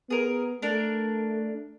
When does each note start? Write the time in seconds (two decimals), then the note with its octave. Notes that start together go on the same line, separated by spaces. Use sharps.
0.10 B3 G#4 A#4
0.62 A3 D4 A#4